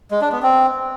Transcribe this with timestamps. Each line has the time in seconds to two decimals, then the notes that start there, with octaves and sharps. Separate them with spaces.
0.11 G#3
0.21 D4
0.32 B3
0.42 C4